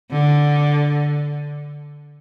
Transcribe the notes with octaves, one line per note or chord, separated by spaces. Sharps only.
D3